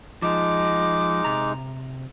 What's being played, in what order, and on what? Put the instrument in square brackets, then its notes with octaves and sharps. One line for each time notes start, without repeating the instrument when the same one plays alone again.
[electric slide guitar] F3 [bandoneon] G#3 D#4 [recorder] D6
[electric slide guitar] C3 A#5